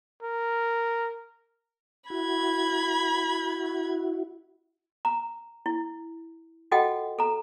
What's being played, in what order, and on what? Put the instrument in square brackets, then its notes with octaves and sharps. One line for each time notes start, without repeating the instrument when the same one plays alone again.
[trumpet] A#4
[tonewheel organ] E4 F#4 [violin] B5 G#6
[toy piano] A#5
E4
F4 F#4 A4 D#5 F#5 G5
A4 A#5